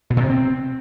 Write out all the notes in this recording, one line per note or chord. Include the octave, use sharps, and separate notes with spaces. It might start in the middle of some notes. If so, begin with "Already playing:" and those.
B2
A#2
C3
C4